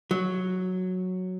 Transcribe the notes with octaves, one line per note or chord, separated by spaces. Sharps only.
F#3